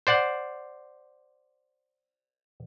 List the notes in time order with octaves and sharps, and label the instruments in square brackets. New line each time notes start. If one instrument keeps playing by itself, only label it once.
[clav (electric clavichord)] C5 D5 F#5